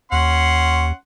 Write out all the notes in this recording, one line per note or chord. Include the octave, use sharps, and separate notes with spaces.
D#2 C#4 F#5 C6